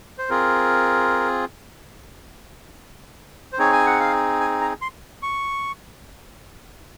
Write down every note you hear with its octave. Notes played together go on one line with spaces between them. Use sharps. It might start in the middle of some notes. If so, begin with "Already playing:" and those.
C5
C4 F4 G#4 A#4
C5
C4 D#4 G#4 C#5
G#5
F#5
F5
G#5
A#5
C6
C#6